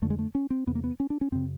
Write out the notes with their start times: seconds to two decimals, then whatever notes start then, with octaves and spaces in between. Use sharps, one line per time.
0.02 F2 D3 A3
0.10 G#3
0.19 A3
0.35 C#4
0.50 C4
0.67 E2 C3 B3
0.75 A#3
0.84 B3
1.00 C#4
1.10 D4
1.21 C#4
1.32 F#2 C#3 C4